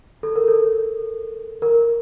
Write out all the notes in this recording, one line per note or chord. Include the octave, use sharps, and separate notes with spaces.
A4
A#4
A4
A#4